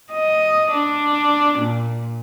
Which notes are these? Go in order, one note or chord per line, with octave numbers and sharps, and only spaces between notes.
D#5
D4
A#2